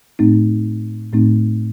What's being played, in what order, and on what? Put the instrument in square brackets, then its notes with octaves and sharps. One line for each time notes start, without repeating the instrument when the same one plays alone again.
[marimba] A2 A3 C4 D#4
A2 A3 C4 D#4